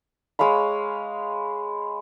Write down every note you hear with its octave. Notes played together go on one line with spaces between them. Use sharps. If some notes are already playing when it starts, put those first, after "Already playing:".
G#3 C#5 F5 B5